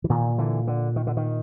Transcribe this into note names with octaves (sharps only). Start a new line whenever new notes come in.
E3
A#2 D#3
D3 E3
D3
D#3
D3
D#3